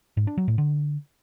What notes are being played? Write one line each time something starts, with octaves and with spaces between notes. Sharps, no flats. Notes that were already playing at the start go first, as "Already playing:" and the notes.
G#2
D4
F#3
A2
D3